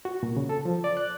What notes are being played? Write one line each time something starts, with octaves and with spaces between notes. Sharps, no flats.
F#4
A#2
C#3
A4
F3
D5
F#6